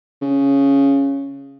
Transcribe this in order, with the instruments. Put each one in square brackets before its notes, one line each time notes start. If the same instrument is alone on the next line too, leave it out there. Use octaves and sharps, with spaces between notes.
[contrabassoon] C#3